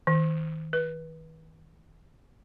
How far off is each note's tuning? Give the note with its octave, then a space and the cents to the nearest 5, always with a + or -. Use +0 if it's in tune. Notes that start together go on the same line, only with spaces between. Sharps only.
D#3 +35
B4 -25